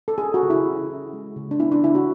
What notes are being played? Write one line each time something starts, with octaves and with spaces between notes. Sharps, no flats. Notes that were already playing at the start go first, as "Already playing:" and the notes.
A4
C#4 G#4
F#4
C#3
E4
C#4
C#4
G#3
C#3
D4
B3 E4
D4
C#3 E4
F#4